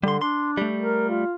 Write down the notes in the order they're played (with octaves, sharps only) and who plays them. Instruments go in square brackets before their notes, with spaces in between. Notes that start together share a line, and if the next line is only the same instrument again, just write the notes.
[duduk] D3 [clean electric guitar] G3 C6
[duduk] D4 [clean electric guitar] C6
[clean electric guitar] G3 A3
[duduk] A#4
F4